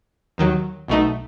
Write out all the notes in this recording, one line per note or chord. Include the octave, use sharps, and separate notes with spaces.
D#2 D#3 F#3
B1 B2 A3 D#4